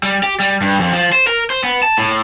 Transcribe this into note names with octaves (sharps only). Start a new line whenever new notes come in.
G3
G4
G3
G2
F2
F3
C5
A#4
C5
B3
A5
A2